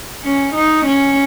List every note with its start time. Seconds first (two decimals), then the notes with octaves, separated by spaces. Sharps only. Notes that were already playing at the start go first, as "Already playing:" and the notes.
0.24 C#4
0.54 D#4
0.85 C#4